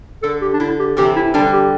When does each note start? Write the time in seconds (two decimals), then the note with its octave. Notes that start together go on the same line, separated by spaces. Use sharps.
0.22 D3 A4
0.41 G4
0.53 D4
0.60 D3 E4
0.79 G4
0.97 C3 E3 G4
1.16 E4
1.34 D3 G3 D4
1.53 G4